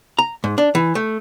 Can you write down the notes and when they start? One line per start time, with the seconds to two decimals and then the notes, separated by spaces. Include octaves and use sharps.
0.19 A#5
0.44 G#2
0.58 D4
0.75 E3
0.95 A3